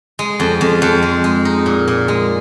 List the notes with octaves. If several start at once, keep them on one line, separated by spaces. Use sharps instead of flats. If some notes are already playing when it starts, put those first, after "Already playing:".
G#3
F2
F2
F2
G#3
G#3
D#4
A#2
A#2
G#3